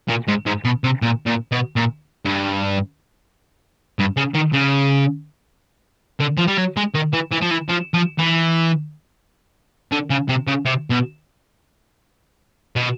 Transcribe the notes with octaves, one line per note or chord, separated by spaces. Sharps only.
A#2
G#2
G#2
B2
C3
A#2
A#2
B2
A#2
G2
G2
C#3
D#3
C#3
D3
F3
G3
F#3
G#3
D#3
E3
E3
F3
E3
F3
F3
E3
D3
C#3
C3
C#3
C3
B2
B2